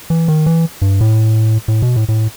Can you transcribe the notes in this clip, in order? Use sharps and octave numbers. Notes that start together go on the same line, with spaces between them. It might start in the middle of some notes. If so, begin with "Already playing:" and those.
E3
D#3
E3
G2
A2
A2
B2
A2
A2